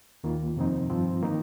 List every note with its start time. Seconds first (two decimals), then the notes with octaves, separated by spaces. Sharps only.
0.24 D#2 D#3 A#3 F4
0.57 F2 C3 F3 C4 D#4
0.89 G2 F3 C4
1.22 D#3 A#3 D#4